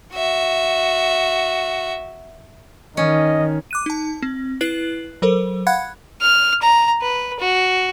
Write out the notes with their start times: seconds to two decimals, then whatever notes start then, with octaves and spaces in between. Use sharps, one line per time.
0.13 F#4 E5
2.97 D#3 C#4 D#5
3.71 D6 F#6 D#7
3.86 D#4 A5
4.22 C4
4.61 E4 B4 F#6 C7 F#7
5.22 F#3 A4 A#4 C5
5.67 F5 F#5 B5 F#6 G#6 C#7
6.21 F6
6.62 A#5
7.02 B4
7.39 F#4